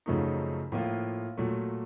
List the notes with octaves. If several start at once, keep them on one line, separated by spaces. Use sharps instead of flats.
F#2 C#3 F3 A3 D#4
A2 F3 A#3 F4
A#2 F#3 A3